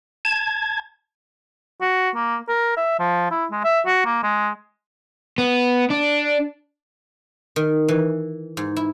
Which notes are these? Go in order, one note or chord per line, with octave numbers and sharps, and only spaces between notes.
A5 G#6
F#4
A#3
A#4
E5
F3
E4
G#3
E5
F#4
A#3
G#3
B3
D4
D#3
E3
G#2
E4